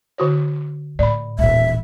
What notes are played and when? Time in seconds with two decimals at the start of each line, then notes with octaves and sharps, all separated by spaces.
0.18 D3 F#4 C#5
0.99 A2 D5 B5
1.39 D#1 E2 A2 E5